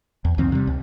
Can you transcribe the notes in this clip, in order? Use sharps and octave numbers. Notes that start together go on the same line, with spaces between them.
E2
C2 F2 D#3 C4
C3 G3
C#2